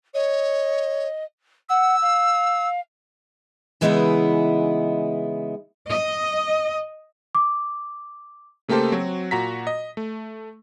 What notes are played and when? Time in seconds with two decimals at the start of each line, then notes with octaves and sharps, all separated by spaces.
0.14 C#5 D#5
1.69 F#5 E6
2.02 F5
3.81 C#3 E3 G#3 B3 D#4 E4
5.88 D#5
7.35 D6
8.68 C#3 A3 A#3 G4 A4 C5
8.92 F#3 C4 F#4
9.31 A#2 F#4 A#5 A#6 B6
9.67 D#5
9.97 A3